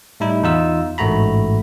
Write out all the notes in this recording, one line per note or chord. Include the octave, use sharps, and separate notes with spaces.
A2 G3 D#4 E4
E2 D#4 F4 E6
A1 G#2 A3 F#4 A#5 B5